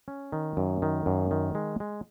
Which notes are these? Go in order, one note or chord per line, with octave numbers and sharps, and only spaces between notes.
C#4
D#3
F#2
D#3
F#2
D#3
G#3
G#3